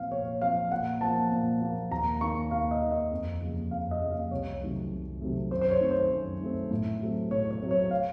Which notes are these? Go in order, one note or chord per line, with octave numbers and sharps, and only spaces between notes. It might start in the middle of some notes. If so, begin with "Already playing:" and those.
Already playing: A#2 F3 C4 F5
A#2 C#5
F3 C4 F5
A#2 F#5
F3 A#3 A5
A#2
F3 A#3
D#2 A#5
D#3 A#3 C#6
D#2 F5
D#5
D#3 A#3
D#5
F2
C#3 F3 A#3
F2 F5
D#5
C#3 F3 A#3
F5
C2 C#5
C3 D#3 F#3 A3
C2
C3 D#3 F#3 A3
F#2 C5
C5
C#5
D#3 A3 C4
C5
F#2
D#3 A3 C4
A2
F#3 A3 C4
A2 C#5
C#5
F#3 A3 C4
C#5
F5